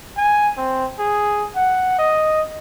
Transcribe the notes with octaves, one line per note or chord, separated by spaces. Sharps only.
G#5
C4
G#4
F#5
D#5